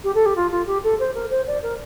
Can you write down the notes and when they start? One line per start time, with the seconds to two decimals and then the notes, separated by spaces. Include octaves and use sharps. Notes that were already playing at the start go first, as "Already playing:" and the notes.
0.03 G4
0.14 A4
0.25 G4
0.35 F4
0.50 F4
0.66 G4
0.83 A4
0.99 C5
1.14 A#4
1.30 C5
1.46 D5
1.62 A#4